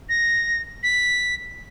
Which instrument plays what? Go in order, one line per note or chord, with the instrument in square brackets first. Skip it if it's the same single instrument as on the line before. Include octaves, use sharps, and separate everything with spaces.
[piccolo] A#6
B6